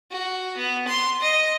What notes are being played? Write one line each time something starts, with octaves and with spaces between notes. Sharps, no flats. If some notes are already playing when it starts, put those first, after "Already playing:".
F#4
B3
C6
D#5